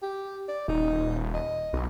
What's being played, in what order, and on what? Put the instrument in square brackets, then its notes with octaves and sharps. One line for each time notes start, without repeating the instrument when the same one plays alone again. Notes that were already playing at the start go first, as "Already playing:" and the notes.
[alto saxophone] G4
D5
[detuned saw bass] D#1 [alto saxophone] D#4
[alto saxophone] D#5
[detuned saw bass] B1